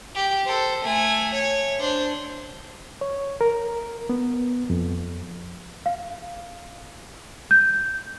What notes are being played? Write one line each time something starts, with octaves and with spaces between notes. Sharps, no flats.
G4
A4 C5
A3 G#5
C#5
D4 C5
C#5
A#4
B3
F2
F5
G6